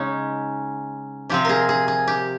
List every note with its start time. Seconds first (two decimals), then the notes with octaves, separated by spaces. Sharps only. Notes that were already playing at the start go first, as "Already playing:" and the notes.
Already playing: C#3 G#3 C#4 D#4
1.29 C3 F3 C4 G4
1.45 G#4 A#4
1.69 G#4
1.88 G#4
2.08 G4